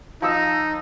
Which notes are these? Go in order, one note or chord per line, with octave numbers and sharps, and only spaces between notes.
F3 D#4 E6